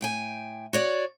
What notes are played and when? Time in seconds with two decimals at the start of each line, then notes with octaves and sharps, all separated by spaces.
0.01 A2 G5 G#5
0.73 F#4 C#5 D5